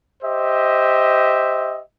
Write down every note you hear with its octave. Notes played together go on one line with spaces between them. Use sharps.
G4 C5 D#5 E5